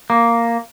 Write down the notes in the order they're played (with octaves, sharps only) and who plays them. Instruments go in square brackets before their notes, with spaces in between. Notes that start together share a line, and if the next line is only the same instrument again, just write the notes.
[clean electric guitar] A#3